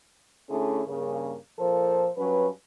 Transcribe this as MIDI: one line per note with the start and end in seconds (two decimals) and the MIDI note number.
0.50 0.81 50
0.50 0.81 57
0.50 0.81 61
0.50 0.81 62
0.50 0.81 64
0.50 0.81 68
0.87 1.36 43
0.87 1.36 49
0.87 1.36 58
1.59 2.09 46
1.59 2.09 53
1.59 2.09 69
1.59 2.09 70
1.59 2.09 72
2.17 2.49 43
2.17 2.49 54
2.17 2.49 61
2.17 2.49 71